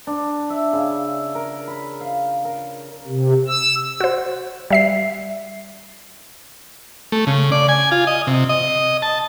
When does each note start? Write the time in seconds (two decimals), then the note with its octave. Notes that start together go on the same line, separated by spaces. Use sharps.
0.07 D4
0.50 E5
0.73 C#3
1.35 A#4
1.67 B5
2.01 F5
2.45 A#4
3.08 C3
3.48 E6
4.00 F#4 C5
4.70 G3 E5 C7
7.12 A3
7.27 C#3
7.52 D5
7.69 G#5
7.91 F4
8.07 D#5
8.27 C3
8.49 D#5
9.02 A5